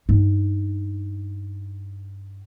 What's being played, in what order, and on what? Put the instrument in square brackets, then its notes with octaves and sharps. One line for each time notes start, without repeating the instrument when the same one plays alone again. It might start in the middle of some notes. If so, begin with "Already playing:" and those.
[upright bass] G2 D#4